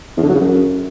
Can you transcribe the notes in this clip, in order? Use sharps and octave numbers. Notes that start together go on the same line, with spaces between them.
E2
D3
F#3
C#3
F#2